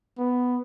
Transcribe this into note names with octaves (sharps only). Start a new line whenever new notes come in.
B3